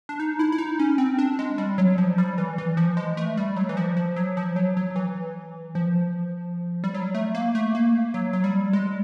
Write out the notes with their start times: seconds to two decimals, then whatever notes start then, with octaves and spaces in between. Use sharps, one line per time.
0.09 D4
0.20 D#4
0.39 E4
0.52 E4
0.58 D#4
0.79 C#4
0.98 C4
1.18 D4
1.39 G#3
1.58 G3
1.78 F#3
1.98 F3
2.18 G3
2.38 E3
2.58 E3
2.77 F3
2.97 G#3
3.17 A3
3.37 G3
3.56 F#3
3.69 E3
3.77 F3
3.97 F3
4.16 F#3
4.37 F3
4.56 F#3
4.77 F#3
4.96 E3
5.75 F3
6.84 G3
6.94 F#3
7.15 A3
7.35 A#3
7.55 A3
7.75 A#3
8.14 F#3
8.33 F#3
8.44 G3
8.73 G#3